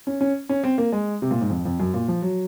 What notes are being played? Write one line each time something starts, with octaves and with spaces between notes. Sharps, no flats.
C#4
C#4
C#4
C4
A#3
G#3
C3
A#2
G#2
F2
F2
F#2
A#2
F3
F#3